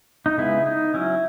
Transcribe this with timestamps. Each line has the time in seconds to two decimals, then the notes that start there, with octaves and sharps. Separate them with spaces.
0.26 D#4
0.38 C#3 G#3 B3 E4
0.66 D#4
0.94 F#3 C#4 E4